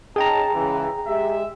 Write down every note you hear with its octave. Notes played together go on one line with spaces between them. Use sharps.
C#4 D#4 G#4 G5 A5 A#5
C#2 C#3 E3
G#3 G4 E5